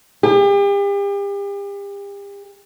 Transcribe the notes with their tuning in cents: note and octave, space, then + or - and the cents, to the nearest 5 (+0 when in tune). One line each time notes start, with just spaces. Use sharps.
G4 +40